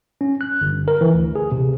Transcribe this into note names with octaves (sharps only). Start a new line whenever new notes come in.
C#4
F#6
G1
A#4
E3
D2
G#4
C3